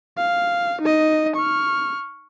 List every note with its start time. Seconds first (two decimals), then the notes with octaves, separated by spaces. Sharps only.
0.18 F5
0.81 D#4 D#5
1.36 C#6 F6